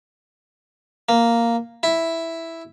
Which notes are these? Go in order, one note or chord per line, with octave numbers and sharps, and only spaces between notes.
A#3
E4